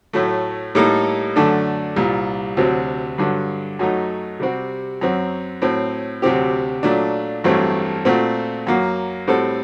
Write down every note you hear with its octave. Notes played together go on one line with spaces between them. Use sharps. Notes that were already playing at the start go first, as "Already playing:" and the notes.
A2 F#3 A3
A2 G3 A#3 D#4 A4
F#2 D3 A3 D4
C2 A#2 G3
D2 C3 F#3 C4 F#4
G2 D3 F#3
F#2 F#3 A3 D#4
C3 G3 C4 F#4
F#2 F#3 C4
A2 F#3 C4
D2 C3 F#3 C4 G4
A#2 F#3 A3 D4
A1 G2 F#3 A3 C4
A#2 A3 C4 F#4
F#2 F#3 A#3 F#4
A2 G3 C4 F#4 A4